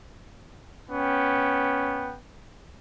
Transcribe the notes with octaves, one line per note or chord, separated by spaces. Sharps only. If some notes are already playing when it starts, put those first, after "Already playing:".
B3 C#4 G5